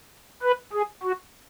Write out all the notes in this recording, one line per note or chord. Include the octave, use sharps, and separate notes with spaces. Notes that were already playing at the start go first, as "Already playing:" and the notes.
B4
G#4
F#4